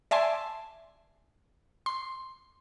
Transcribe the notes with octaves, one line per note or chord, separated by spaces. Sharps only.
D5 E5 G#5 A5 C6
C6